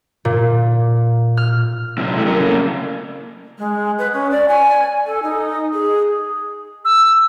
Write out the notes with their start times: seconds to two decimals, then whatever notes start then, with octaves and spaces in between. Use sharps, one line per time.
0.25 A#2
1.37 F6
1.98 C3 F#3
2.14 E3 A3
2.27 F#3 A#4
2.39 C#3 A#3
3.58 G#3
3.98 B4
4.13 C#4
4.31 D5
4.48 G#5
5.06 A4
5.23 D#4
5.73 G#4
6.85 E6